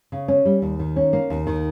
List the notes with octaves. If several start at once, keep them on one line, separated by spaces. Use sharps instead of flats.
C#3
C#4
G3
D#2
D#3
C#4
A#3
D#2
D#3